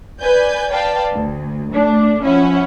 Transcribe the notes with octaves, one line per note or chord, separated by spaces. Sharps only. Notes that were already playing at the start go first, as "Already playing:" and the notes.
B4 D5 G#5 G6
B4 D5 F5 G5 A5
D2
A3 D4
F3 C#4 E4 F#5